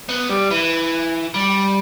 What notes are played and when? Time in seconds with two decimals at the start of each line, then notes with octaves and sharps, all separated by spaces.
0.09 B3
0.29 G3
0.51 E3
1.34 G3